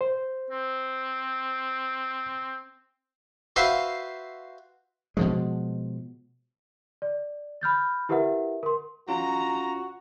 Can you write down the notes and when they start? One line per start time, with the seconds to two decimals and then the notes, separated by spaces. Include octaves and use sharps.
0.01 C5
0.51 C4
3.56 F#4 B4 C5 E5 F5
5.17 B2 F3 G#3
7.02 D5
7.61 B5 F6 G6 A6
8.09 E4 G4 A#4 B4 E5 F#5
8.63 A#4 C6
9.09 C#4 F4 F#4 A#5